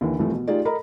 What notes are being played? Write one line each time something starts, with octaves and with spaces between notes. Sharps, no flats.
D#2 D3 E3
C2 E3 F3 A3
B2
A3 D#4 F4 G4 G#4 D5
A4 A#4 D#5 A#5 B5